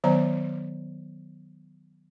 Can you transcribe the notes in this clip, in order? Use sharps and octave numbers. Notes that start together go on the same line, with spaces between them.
D#3 F#3 B3 C5 D5 A#5